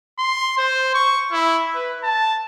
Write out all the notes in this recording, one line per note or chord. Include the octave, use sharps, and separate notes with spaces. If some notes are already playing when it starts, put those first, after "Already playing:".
C6
C5
C#6
E4
B4
A5